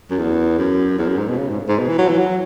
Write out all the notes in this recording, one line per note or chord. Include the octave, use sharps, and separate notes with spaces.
F#2
E2
F#2
E2
F#2
G#2
B2
C#3
G#2
G#2
B2
E3
F#3
E3
F#3